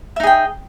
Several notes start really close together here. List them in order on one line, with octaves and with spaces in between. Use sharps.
E5 D#4 G#4 G5